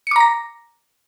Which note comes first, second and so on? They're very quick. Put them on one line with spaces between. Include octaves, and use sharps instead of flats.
C#7 D6 A#5 A#6